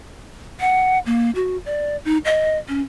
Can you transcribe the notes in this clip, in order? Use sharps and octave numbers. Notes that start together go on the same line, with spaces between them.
F#5
A#3
F#4
D5
D#4
D#5
C#4